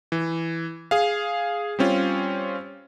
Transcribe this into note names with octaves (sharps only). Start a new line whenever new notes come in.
E3
G#4 F5
G3 C4 C#4 F4